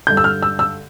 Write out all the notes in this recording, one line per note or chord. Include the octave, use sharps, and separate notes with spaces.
G2 D3 G6
E6
F6
E6
E6